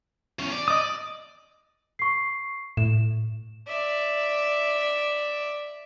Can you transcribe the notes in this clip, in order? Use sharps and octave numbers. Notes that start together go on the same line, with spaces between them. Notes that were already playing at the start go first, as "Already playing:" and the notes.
E2 C#4
D5
D#5 D#6
C#6 C7
A2 E7
D5 E5